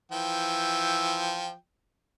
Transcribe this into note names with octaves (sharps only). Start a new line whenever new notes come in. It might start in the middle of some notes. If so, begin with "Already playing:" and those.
E3 F3 G5